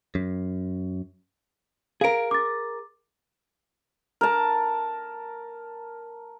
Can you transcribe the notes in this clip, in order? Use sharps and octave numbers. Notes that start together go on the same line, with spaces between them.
F#2
G#4 A#4 F5 D7
D6 A6
A#4 A5